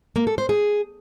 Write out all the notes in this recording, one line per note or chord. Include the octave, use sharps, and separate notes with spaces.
A#3
A4
C5
G#4